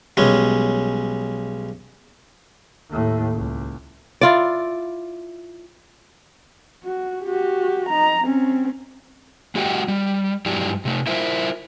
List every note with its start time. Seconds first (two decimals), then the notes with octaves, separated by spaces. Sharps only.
0.17 B1 G3 G#3 C#4
2.90 D#2 A2
3.34 C#2
4.21 E4 F4 D5
6.84 F#4
7.24 F#4 G4
7.89 D#4 A#5
8.23 C4 C#4
9.55 G#3 F#4 G4 D#5 F#5 G5
9.88 G3
10.46 G2 F#3 G#3 E4 G4 D5
10.85 C3 A3
11.07 E4 F4 A#4 C5 E5